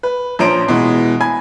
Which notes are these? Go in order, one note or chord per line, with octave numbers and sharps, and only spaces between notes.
B4
A#1 F3 C#4 C5 A#5 D7
B2 E3 G#3
G#5 B5 G#6